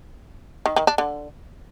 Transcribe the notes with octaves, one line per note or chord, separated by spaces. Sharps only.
D#3
D#3
D4
D3